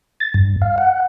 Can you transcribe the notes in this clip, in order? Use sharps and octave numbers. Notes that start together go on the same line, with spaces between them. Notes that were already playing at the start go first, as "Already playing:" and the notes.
A6
G2
F5
F#5